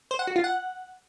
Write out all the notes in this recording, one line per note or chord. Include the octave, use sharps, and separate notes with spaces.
C5
F#5
F#4
F4
F#5